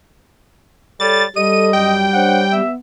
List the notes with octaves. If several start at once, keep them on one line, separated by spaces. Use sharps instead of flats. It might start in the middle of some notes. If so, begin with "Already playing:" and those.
G3 A4 C#5 A6
G3 A4 D#5 D#7
F#2 G5
D4 C5 C#5 F#5
B3 E5